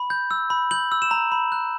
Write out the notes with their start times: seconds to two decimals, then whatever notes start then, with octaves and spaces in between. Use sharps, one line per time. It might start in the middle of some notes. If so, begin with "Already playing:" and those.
Already playing: B5
0.10 G6
0.31 E6
0.50 B5
0.71 G6 F#7
0.92 E6
1.02 E7
1.11 A#5
1.32 B5
1.52 F#6